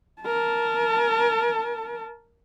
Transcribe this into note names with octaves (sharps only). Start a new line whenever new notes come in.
A#4 A5